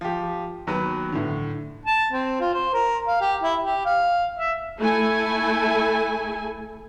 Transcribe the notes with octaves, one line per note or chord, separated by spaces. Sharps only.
F3 G4
D#2 F#3 B3 B4
A2 D3
A5
C4
F4
C5
A#4
F5
G4
E4
G4
F5
E5
A3 E4 A4 G#5